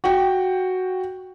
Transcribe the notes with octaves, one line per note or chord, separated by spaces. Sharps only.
F#4 G5